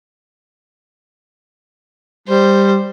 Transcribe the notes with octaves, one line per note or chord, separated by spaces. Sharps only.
G3 C5